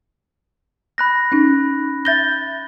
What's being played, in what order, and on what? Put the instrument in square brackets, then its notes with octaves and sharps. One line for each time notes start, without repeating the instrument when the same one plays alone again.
[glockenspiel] B5 F#6 A#6
[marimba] C#4 D#4
[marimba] E5 G6 A#6 [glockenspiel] A6 G7